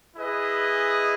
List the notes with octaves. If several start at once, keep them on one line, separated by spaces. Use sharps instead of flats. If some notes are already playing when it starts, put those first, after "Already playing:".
E4 G#4 B4 D#5